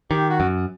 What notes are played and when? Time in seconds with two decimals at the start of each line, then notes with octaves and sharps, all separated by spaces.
0.11 D#3 G4
0.30 F#4
0.40 F#2